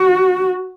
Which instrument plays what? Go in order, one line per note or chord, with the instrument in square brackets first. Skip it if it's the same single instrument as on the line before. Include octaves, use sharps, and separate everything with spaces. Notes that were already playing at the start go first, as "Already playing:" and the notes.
Already playing: [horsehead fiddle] F#4